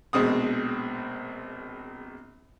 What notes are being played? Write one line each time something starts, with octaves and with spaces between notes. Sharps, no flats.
A#1 B2 G#3 C4 D#6